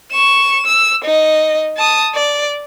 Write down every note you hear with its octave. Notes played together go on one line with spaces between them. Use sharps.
C#6 E7
E6
D#4 D#5
A5 D#6
D5